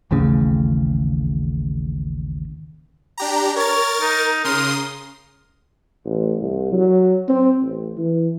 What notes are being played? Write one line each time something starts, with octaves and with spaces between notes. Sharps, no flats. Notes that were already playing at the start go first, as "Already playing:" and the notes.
A1 D#2 A2 C#3
D4 G4 A#5
A#4 C#5 A6
D#4
C#3 A#4 C6 D#6
A1
C2
F#3
C4
A1
E3